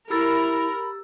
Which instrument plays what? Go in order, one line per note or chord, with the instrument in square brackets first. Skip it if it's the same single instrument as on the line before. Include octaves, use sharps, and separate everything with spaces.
[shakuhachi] E4 [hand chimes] G4 E6 A6 [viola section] A#4 [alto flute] B5